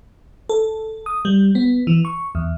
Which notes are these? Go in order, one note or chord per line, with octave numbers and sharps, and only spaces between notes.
A4
D#6
G3
B3
E3
C#6
E2